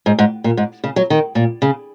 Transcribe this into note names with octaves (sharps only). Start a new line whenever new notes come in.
G#2
G#2
A#2
G#2
C#3
F#3
D#3
A#2
C#3